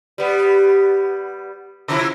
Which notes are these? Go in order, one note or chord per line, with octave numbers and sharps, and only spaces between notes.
G3 B3
C3 F3 E4